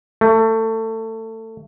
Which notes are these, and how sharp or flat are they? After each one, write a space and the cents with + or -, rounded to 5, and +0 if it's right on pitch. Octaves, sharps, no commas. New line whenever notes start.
A3 +25